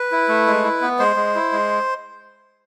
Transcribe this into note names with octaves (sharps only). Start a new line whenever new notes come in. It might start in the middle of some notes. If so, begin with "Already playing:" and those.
Already playing: B4
E4
A3
G#3
E4
B3
G#3 C5
G#3
E4
G#3